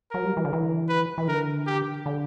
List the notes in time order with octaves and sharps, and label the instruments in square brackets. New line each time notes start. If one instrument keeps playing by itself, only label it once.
[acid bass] F#3 [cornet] A#4
[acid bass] G3
E3
D3
E3
[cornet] B4
[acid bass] E3
[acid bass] D3 [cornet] A#4
[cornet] G4
[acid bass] D3